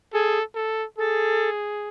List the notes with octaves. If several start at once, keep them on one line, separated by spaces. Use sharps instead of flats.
G#4 A4
A4
G#4 A4